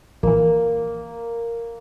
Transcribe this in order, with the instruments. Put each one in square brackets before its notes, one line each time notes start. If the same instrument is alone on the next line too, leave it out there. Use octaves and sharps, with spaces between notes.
[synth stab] A#1 E3 [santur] A#3